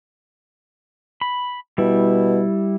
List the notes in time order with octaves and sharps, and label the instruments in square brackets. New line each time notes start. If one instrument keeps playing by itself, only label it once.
[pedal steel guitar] B5
[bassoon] B2 [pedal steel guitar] G3 E4